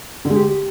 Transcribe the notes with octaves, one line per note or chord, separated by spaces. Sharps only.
D3
G#3
G4